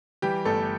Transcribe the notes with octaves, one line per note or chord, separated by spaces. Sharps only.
E3 G3 G4
G1 A3 A4